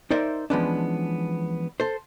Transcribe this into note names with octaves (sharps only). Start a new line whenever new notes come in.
D#4 A#4 C5 D5 E5
E3 F3 G#3 B3 C#4 D4
A4 C5